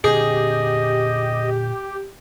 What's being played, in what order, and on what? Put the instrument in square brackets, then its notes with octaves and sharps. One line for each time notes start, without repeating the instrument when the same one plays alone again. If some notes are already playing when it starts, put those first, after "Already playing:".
[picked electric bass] A#2 D3 C#4 [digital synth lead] G4 [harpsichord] G#4 [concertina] D#5